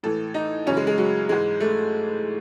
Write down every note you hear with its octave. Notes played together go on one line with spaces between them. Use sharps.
A2 E3 A4
D#4
F#2 C#3 E3 C#4
G#3
G#3
F#3
G#2 E3 G#3
A3